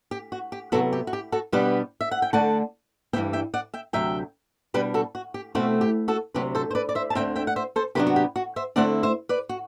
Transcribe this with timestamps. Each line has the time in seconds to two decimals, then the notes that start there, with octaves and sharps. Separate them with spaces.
0.11 G4
0.32 F#4
0.52 G4
0.72 C3 F#3 B3 F#4 A4
0.93 G4
1.07 F#4
1.13 G4
1.32 F#4 A4
1.52 B2 G3 B3 D4 G4 B4
2.01 E5
2.11 F#5
2.22 G5
2.33 D3 A3 D4 F#5 A5
3.13 G2 E3 G3 B3 E5 G5
3.33 E5 G5
3.54 D5 F#5
3.74 E5 G5
3.93 D2 C3 F#3 E5 G5
4.74 B2 G3 D4 G4 B4
4.94 F#4 A4
5.15 F#4
5.34 G4
5.55 B2 A3 C4 E4 F#4
5.81 G4
6.08 F#4 A4
6.34 D2 C3 F#3 G4 B4
6.55 A4 C5
6.71 C5
6.75 B4 D5
6.89 D5
6.95 C5 E5
7.10 A5
7.15 D2 D3 A3 C4 E5 G5
7.36 E5 G5
7.47 F#5
7.56 C5 E5
7.76 A4 C5
7.95 C3 F#3 B3 D4 G4 B4
8.07 F#4
8.16 G4
8.36 F#4
8.56 C5 E5
8.76 D3 A3 C4 E4 D5 F#5
9.03 C5 E5
9.29 B4 D5
9.49 F#4